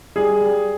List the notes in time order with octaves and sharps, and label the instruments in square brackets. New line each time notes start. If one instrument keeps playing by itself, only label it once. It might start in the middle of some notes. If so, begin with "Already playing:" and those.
[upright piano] G3 G#4
G3